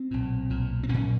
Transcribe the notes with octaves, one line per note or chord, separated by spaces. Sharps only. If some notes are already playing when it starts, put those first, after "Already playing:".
Already playing: C4
B1 A#2
B1 A#2
C4
B1 A#2 C#4